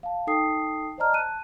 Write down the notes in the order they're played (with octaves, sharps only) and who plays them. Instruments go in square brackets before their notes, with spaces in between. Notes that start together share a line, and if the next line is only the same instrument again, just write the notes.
[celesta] F5 A5
D#4 A4 G5 A5 D#6 C7
C5 D5 D#5 A5 A#5 F6
A5 F#6 D#7